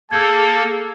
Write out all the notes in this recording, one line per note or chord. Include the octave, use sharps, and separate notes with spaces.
A#3 G#4 A4 A5 E6 G6 G#6